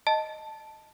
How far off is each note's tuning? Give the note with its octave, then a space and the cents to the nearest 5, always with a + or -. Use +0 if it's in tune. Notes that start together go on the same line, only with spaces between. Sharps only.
D#5 +0 A5 +0